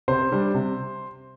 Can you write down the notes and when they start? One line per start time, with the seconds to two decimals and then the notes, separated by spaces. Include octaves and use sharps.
0.08 C3 C5
0.32 G3 D4
0.54 C3